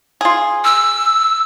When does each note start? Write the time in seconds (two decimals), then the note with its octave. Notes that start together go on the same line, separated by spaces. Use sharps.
0.21 F4 G#4
0.64 E6